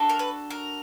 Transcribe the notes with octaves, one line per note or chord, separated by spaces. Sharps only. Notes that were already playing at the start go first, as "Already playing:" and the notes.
Already playing: D4 F#4 A4
A#4
B4
A#4